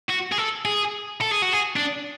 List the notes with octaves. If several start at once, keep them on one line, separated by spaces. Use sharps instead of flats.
F#4
G#4
A4
G#4
A4
G#4
F#4
G#4
D4